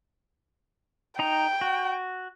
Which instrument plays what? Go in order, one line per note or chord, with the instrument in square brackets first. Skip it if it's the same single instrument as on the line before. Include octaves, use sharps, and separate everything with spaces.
[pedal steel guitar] D#4 A#5 [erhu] G5
[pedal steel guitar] F#4